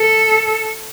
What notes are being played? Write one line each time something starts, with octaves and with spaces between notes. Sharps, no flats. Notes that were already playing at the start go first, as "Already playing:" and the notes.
Already playing: A4